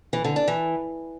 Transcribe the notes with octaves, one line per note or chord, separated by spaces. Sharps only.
E3
D3
D4
E3